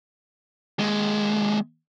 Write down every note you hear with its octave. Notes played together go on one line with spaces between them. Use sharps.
D#2 G#3